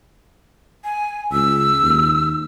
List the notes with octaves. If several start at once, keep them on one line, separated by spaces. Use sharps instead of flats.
G#5
C#2 E6
D#2